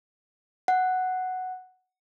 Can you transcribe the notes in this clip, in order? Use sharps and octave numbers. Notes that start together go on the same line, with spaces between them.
F#5